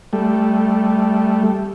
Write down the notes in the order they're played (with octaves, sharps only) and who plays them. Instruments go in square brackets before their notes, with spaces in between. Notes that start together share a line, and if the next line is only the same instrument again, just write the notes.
[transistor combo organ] G3 A3